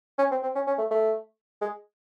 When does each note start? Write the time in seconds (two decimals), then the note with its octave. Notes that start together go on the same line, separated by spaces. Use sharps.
0.19 C#4
0.31 C4
0.43 C4
0.55 C#4
0.67 C#4
0.78 A3
0.91 A3
1.61 G#3